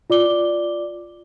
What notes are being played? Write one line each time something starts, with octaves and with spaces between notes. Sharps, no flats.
F4 D5 D6 G7